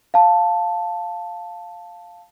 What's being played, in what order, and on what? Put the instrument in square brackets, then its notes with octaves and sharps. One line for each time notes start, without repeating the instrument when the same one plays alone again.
[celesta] F5 A5